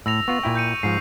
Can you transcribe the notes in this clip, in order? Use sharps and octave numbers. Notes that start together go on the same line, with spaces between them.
A2 E6 A#6 F7
B3 F4 C#6
A#2 E4 G5
G6 C#7 D#7
G#2 F3 C7